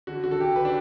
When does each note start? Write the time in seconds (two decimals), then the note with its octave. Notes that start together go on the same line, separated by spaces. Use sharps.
0.07 D3 F#4
0.24 D3 F#4
0.31 A4
0.41 D3 G4
0.56 D3 B4
0.65 D4